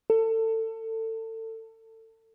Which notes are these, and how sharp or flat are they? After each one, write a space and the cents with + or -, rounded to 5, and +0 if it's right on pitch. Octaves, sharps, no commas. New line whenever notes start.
A4 +25